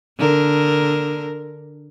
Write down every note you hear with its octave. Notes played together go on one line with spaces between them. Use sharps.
D3 A#4